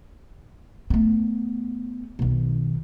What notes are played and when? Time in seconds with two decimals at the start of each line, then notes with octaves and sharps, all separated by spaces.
0.90 A3 B3
2.19 B1 D#3